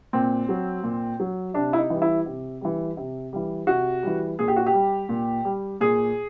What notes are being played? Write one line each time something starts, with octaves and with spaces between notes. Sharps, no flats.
A#2 C4
F#3
A#2
F#3
C3 D4
E4
D#4
E3 G3
E4
C3
E3 G3
C3
E3 G3
C3 F#4
E3 G3
A#2 G#4
G4
F#4
G4
G3
A#2
G3
A#2 G#4